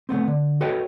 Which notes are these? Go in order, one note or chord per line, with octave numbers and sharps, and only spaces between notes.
C#3 A3 B3 C4
D3
F#4 A4 B4 C#5 D#5 G5